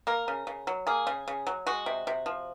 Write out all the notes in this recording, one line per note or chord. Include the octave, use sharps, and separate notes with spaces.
A#3 A#4
C#3
C#3
F#3
A#3 G#4
C#3
C#3
F#3
G#3 F#4
C3
C3
F3